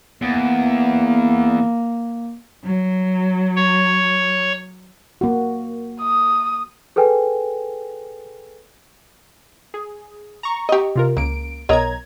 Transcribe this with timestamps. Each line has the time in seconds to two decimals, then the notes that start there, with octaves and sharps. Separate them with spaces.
0.21 E2 A#3
2.64 F#3
3.56 C#5
5.21 A#3 F#4
6.01 D#6
6.96 G#4 A4 B4 G5 G#5
9.74 G#4
10.43 A#5 C#6
10.69 G4 D#5
10.96 C3 F4 A#4
11.17 C#2 A#3 D7
11.69 B1 A#4 C#5 D#5 A#5 G#6